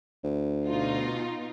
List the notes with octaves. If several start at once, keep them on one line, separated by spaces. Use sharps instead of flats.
D2
B2 D#4 F4